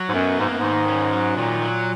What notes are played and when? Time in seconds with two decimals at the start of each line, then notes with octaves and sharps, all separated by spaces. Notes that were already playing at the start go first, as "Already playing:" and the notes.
Already playing: F#3
0.09 G#2
0.14 F#2 B3
0.39 G#2 A#3
0.49 F#2
0.59 G#2 D#3
0.88 C#4
1.12 F#3
1.36 A#2 D#3
1.62 F#3